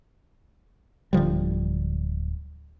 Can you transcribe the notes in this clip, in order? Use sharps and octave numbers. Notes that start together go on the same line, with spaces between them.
D1 D3 F3 G3